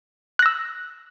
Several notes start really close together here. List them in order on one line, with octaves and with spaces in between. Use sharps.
F#6 A#6 E6